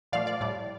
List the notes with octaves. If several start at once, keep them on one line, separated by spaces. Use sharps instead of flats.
A#2 F3 A3 D5 F5
D5
A2 G3 D5